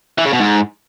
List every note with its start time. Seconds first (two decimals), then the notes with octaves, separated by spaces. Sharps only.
0.18 E3
0.25 C#3
0.33 B2
0.40 G#2